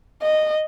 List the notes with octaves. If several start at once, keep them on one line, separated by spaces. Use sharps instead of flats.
D#5